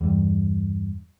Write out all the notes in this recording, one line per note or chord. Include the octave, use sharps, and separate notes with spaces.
E2 G2